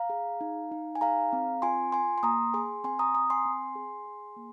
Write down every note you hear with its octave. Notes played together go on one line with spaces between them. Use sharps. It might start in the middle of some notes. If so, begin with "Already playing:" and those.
Already playing: F5 A#5
G#4
D#4
D#4
G#5
G#4 F5 A#5
C4
F4 G#5 C6
F4 G#5 C6
C6
A#3 A#5 D#6
G#4 G#5 C6
C4 G#5 C6
A#5 D#6
C4 A#5 D#6
G#5 C6
C4
G#4
G#4
A#3